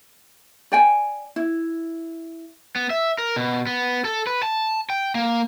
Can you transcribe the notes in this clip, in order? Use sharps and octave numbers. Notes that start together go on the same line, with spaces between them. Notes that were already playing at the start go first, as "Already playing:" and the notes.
D5 G5 G#5
E4
B3
E5
A#4
B2
B3
A4
B4
A5
G5
A#3